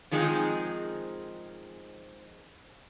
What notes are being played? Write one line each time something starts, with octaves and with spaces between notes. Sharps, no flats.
D#3 F3 G#3 C4 D#4 G#4